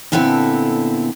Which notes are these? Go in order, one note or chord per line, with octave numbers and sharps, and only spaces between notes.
A#2 D3 B3 C4 E4 A4